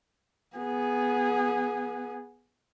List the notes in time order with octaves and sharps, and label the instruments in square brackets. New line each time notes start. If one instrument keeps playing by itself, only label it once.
[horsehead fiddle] B3 G#4